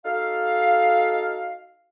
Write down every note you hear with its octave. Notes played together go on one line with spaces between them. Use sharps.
D#4 F#4 A4 F5